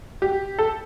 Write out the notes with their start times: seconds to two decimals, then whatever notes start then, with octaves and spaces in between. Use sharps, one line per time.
0.22 G4
0.59 A4